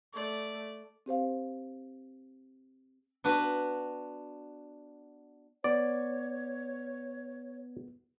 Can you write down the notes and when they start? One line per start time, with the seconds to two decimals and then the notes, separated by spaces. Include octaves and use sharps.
0.14 A3 D5
1.06 C4 G4 C5 F5
3.24 B3 D4 F#4 B4
5.64 B3 C#5 D5